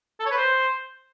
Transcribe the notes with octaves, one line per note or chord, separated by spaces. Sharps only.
A4
C#5
B4
C5